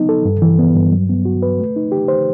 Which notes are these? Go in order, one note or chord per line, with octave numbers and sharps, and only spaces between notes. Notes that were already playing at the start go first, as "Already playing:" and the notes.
Already playing: F#3 B3 D#4
A4
G2
E3
B3
G2
F#3
B3
F#4
B4
A3
D#4
G4
C5